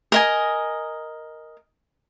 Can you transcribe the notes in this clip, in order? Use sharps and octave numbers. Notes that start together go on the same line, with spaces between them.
A#4 D#5 G#5